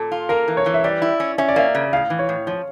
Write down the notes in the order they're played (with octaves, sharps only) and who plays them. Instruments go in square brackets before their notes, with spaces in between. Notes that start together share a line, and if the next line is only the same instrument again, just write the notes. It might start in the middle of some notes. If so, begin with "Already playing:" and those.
Already playing: [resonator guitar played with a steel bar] A#2 [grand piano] A4
[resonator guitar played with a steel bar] F4
[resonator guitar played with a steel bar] A#3 [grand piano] A#4
[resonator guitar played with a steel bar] E3
[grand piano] C#5
[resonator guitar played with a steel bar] E3
[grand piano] E5
[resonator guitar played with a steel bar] G3 [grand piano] D5
[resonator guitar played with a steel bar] E4
C#4
[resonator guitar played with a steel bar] C#4 [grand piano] E5
[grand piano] D5
[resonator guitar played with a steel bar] A#3 [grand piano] E5
[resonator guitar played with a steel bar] C#3
[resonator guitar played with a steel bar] A2 [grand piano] F5
[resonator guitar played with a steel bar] E3
[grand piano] C#5
[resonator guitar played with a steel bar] A2
[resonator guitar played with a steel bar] F3 [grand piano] C#5